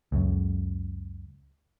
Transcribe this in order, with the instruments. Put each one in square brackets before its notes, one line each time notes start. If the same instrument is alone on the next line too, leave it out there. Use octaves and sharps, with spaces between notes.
[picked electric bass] C#2 F#2